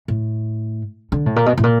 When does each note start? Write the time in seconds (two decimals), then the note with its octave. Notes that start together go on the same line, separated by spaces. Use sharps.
0.08 A2
1.12 D3
1.26 A2
1.36 A#2
1.46 B2
1.58 A2
1.63 A#2